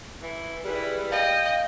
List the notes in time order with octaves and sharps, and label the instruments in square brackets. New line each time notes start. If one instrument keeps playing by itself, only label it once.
[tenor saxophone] E3
[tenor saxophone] G3 [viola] E4 B4 [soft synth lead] G#4
[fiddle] D#5 [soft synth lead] F5 [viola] G5